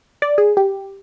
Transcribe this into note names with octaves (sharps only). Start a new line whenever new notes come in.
D5
G#4
G4